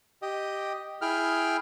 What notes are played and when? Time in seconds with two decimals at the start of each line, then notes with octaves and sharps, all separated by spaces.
0.22 G4 D#5
1.02 E4 G#4 G5 F6